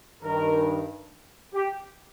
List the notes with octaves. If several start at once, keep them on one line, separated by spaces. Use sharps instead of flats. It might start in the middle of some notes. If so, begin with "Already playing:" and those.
G2 D#3 A#4
G4